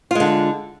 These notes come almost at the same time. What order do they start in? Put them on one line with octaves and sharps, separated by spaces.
F4 G#3 D3